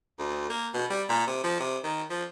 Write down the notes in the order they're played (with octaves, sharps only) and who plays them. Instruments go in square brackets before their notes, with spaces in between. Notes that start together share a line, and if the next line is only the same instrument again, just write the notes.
[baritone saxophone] D2
A#3
B2
G3
A#2
C3
F3
C3
D#3
F3